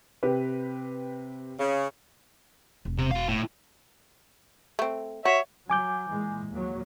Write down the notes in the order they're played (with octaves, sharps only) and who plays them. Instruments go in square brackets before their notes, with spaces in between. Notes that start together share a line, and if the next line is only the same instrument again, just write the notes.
[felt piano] C3 G4 B4
[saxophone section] C#3
[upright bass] E1
[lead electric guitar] C3
F#4 F5
A2
[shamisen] A3 C4
[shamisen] F#4 [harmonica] C#5 E5
[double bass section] F#3 [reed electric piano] G#5 D6 G6
[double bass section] A#2 E3 G#3
D#2 A#2 F#3